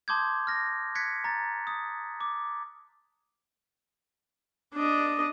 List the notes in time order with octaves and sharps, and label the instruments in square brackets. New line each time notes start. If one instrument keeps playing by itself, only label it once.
[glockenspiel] A5 C6 D6 D#6 G6 G#6
F6 A#6
F#6 G#6 B6 C#7
A#5 A6
D#6
D6
[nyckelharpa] D4 D#5